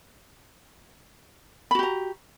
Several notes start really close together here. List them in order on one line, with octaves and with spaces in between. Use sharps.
B5 F#4 G4 A#5